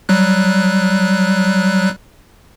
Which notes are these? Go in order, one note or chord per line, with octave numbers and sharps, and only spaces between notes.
F#3 G3 F#6